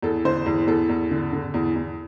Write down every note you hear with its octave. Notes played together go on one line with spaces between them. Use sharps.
E2 A4
D3 C5
E2
E2 A4
E2
D3
D3
E2
E2